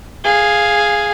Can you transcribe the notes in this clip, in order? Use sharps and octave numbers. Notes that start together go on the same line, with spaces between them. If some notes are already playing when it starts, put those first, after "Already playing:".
G#4 F5